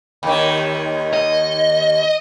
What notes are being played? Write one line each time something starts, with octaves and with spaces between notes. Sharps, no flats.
D#2 D#3
D#5